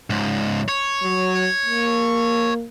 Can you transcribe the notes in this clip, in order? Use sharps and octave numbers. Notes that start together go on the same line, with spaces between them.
C#2 G#2
C#5
F#3
A#3